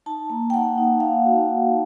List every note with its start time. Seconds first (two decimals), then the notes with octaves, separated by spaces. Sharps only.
0.06 D#4 A5
0.30 A#3
0.50 G5
0.54 A#3 F#5
0.78 D#4
1.00 D#4 F5
1.25 F#4
1.48 F#4